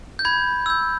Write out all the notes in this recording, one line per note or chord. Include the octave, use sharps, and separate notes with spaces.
G6
B5 G#6
E6 G6